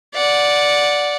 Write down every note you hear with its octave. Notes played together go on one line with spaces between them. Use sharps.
D5 F#5